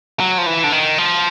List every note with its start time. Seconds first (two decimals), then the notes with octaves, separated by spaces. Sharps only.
0.20 F#3
0.38 F3
0.46 E3
0.64 D3
0.72 D#3
0.98 F3